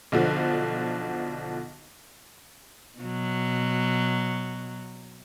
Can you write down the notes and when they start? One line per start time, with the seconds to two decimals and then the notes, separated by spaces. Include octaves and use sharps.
0.12 B1 D3 F3
2.99 B2 F#3